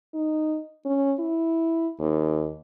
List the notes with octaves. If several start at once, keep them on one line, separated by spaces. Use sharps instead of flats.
D#4
C#4
E4
D#2